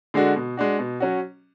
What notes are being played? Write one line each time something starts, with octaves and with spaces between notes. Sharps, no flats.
D3 G#3 D4 F#4
B2
G#3 D4 F#4
B2
F#3 C#4 F#4